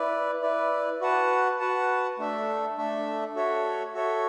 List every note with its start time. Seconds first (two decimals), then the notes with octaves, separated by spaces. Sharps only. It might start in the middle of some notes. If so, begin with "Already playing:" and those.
Already playing: E4 B4 D5
0.42 E4 B4 D5
1.01 F#4 B4 F#5 A5
1.60 F#4 B4 F#5 A5
2.19 A3 D4 A4 E5
2.77 A3 D4 A4 E5
3.36 F#4 A4 C#5 E5
3.94 F#4 A4 C#5 E5